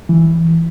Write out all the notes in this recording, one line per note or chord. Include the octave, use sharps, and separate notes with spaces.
E3